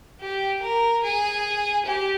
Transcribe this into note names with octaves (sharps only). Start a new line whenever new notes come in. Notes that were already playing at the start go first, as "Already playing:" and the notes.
G4
A#4
G#4
G4